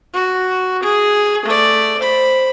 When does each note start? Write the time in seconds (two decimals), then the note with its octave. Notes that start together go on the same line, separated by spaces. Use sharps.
0.14 F#4
0.83 G#4
1.46 A3 D5
1.99 C5 B5